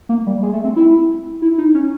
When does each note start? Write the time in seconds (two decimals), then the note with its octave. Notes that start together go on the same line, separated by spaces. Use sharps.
0.09 A#3
0.27 G3
0.43 G#3
0.53 A3
0.64 C4
0.76 E4
1.42 E4
1.58 D#4
1.74 C#4